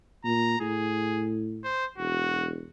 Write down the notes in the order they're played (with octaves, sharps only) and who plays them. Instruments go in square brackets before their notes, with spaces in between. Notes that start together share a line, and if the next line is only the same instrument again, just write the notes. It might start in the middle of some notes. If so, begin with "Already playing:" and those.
[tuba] A#2 [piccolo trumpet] A#5
[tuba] A2 [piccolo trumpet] G#4
[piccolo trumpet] C5
[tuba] E1 [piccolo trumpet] F#4